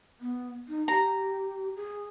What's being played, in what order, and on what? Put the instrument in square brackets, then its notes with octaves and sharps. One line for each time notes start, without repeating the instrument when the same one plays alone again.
[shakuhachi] B3
D#4
[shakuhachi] G4 [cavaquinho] A#5
[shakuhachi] G#4